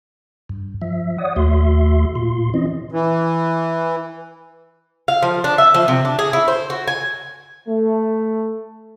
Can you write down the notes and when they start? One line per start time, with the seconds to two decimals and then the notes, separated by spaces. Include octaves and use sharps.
0.49 G2
0.82 F3 E5
1.18 C#5 D5 F#5 D#6
1.36 D#2 A3 F#4 E5 C6
2.15 A#2 F4 C6
2.54 E3 C4 C#4 E4 D#5
2.92 E3
5.08 F5
5.22 F3
5.44 D4
5.58 E5
5.74 F3
5.88 C3
6.05 D4
6.19 G#4
6.33 E4
6.48 C5
6.70 F#4
6.88 G#5
7.68 A3